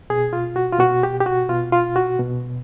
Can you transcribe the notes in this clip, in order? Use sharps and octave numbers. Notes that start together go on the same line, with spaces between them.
B2 G#4
F4
F#4
F4
B2 F#4
G4
G4
F#4
B2 F4
F4
F#4
B2